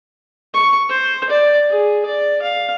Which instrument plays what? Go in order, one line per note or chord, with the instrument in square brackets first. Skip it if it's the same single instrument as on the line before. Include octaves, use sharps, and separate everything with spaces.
[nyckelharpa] C#6
C5
D5
G#4
D5
F5